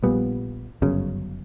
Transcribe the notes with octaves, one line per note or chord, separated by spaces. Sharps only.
A#1 A#2 G3 B3
G1 F#2 C#3